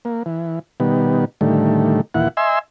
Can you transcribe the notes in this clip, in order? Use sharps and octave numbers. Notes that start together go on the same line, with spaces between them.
A#3
E3
B2 D#3 G3 B3
A2 D3 D#3 G3 A3
D#2 A#2 E3 E4 F#5
D#5 E5 G#5 C6 E6